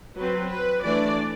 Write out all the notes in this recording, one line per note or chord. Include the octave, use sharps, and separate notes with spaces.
F#3 C4 B4
B4
E3 A3 D4 D5